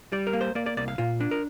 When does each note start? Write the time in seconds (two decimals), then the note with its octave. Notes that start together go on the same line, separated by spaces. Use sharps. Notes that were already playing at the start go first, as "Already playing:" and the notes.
0.12 G3 D5
0.27 A#4
0.33 A#3
0.41 C5
0.55 A#3 D5
0.66 D5
0.77 C2 D5
0.88 F5
0.98 A#2 F4
1.20 D4
1.31 A#4